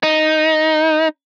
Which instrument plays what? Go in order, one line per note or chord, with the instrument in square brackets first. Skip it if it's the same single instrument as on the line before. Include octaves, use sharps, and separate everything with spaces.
[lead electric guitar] D#4